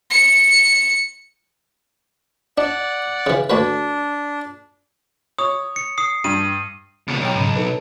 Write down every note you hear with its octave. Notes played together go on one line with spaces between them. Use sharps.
C#7
D4 D5 F#5
C#3 E3
D2 D4 F#4 B4
C#5 D#6
C#7
D#6 C7
G2 D#7
C#2 B2
B1 C#5 G5
G#2 C#3
D#4 A4 B4